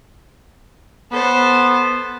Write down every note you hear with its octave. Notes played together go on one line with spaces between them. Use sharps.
B3 A4 C5